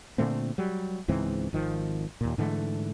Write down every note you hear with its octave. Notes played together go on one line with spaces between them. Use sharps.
A#2 D3 A3 C4
F#3 G3
C#2 G#2 E3 C4
G#1 D#3 F3
D#2 A#2
G#2 D3 E3 A3